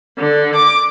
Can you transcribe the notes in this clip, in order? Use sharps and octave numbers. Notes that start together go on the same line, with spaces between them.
D3
D6